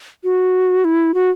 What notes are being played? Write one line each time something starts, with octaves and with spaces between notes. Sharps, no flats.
F#4
E4
F#4